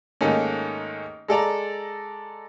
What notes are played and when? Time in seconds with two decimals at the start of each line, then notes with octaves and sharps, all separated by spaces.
0.21 G#2 D#3 A3 A#3 C#4
1.28 G#3 A4 D5 A#5